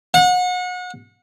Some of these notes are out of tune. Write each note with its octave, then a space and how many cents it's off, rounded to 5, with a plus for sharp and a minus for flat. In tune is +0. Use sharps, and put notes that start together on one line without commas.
F#5 -35